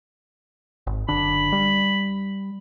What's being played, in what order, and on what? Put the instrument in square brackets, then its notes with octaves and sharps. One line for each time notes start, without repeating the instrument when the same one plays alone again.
[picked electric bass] G#1
[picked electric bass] F#1 D3 D4 [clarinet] B5
[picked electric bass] G3